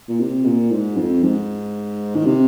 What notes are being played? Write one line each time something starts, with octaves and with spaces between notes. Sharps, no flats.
A#2
C3
A#2
G#2
F2
G#2
D#3
C3